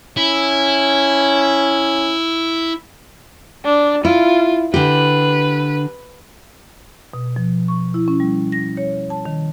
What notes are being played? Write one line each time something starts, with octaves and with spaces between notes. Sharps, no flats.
C#4 E4
D4
E4 F4
D3 G4 B4
B2
F3
C#6
E4
C#4
G3
A#6
C#5
A5
D#3